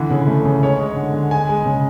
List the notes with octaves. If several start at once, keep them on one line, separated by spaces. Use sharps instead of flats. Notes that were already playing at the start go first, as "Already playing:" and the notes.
Already playing: D3 E3
C#3
A3
C#3
G#3 C#5
G#3
D3
D3
G#3 G#5
G#3
C#3